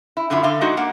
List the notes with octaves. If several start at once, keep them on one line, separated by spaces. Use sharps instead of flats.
E4
F#2 D3 F3 E4 F4
D3 F5
F#3 G#3 D4 D#4 F#4
A#3 F#5